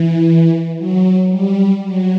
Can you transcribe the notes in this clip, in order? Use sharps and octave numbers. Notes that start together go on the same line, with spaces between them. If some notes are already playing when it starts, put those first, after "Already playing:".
Already playing: E3
F#3
G3
F#3